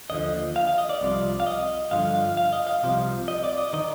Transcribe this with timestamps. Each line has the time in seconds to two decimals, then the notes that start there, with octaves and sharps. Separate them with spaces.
0.10 D#2 D3 F3 D#5
0.56 F5
0.67 F5
0.78 D#5
0.89 D5
1.01 C2 C3 F3
1.40 F5
1.46 D#5
1.91 G2 D3 F3 F5
2.15 F5
2.37 F5
2.53 D#5
2.67 F5
2.83 C2 C3 F3
3.28 D#5
3.44 D5
3.58 D#5
3.73 D#3 D#5